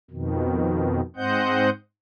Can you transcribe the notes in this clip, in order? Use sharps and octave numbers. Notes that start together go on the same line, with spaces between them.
F2 B2 D#3
G#2 C4 C5 D#5 F#5 G6